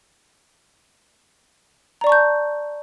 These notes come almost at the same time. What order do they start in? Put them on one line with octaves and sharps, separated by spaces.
A#5 D5 C#6 A5 G6